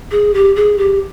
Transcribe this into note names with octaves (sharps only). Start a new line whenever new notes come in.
G#4
G4
G#4
G4